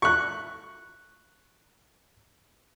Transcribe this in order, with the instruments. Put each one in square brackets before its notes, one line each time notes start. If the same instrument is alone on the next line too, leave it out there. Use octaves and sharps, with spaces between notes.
[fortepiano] C#6 F#6